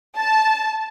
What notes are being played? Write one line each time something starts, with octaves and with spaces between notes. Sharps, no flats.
A5